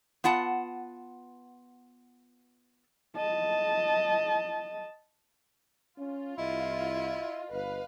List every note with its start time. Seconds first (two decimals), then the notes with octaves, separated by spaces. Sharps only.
0.24 B3 F4 F#5 A5
3.17 D#5 A5
5.98 C#4 F4
6.38 C2 E4 D#5
7.52 G1 B4 F5